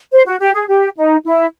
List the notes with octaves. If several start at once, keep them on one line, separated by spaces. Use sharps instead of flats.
C5
F#4
G4
G#4
G4
D#4
E4